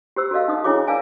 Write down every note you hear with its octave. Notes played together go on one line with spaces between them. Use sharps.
G4 C5 E6
F#4 A4 D5 D#5 F5
D#4 D#6
D4 E4 G#4 C#5 E5 D6
A#4 D5 E5 F5 G#5 A5